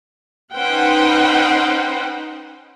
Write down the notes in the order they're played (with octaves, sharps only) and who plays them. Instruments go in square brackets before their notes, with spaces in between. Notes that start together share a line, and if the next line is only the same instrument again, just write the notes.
[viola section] C#4 D#4 B4 C5 F#5 G5